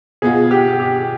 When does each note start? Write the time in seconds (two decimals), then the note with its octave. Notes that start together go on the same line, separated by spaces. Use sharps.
0.22 B2 B3 F4 G#4
0.51 G4
0.80 G4